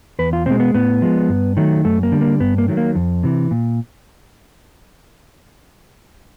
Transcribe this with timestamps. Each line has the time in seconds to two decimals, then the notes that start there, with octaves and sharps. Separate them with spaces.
0.19 E2 B4
0.33 F4
0.46 B2 G#3 C4
0.60 B3
0.74 A2 B3
1.02 F3 G#3
1.29 G2
1.57 D#3 F#3 A3
1.84 F#2 A3
2.03 A#3
2.12 D3 G3
2.21 A#3
2.40 G2 B3
2.58 A#3
2.68 D#3 F#3 A3
2.77 A#3
2.95 F2
3.23 C3 E3
3.51 A#2